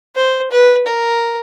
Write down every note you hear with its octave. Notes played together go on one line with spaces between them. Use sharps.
C5
B4
A#4